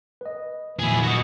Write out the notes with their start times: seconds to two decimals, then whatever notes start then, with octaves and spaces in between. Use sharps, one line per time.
0.21 B4 D#5
0.79 A#2 F#3 E4 G#4
1.03 F#4 D#5